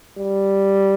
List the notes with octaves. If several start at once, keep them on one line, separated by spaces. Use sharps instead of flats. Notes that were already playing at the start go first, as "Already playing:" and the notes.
G3